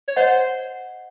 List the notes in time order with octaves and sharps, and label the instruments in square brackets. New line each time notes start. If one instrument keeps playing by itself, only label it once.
[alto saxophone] C#5
[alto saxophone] C5 [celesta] D#5 F#5